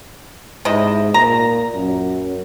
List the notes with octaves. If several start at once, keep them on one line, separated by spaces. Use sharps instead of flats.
G#2 C3 E4 D#5
A#2 A#5
F#2